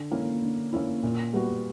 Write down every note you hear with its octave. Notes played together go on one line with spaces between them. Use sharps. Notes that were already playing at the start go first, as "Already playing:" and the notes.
Already playing: D3
A#3 C#4 E4
D3
A#3 C#4 E4
A#2
G3 B3 F#4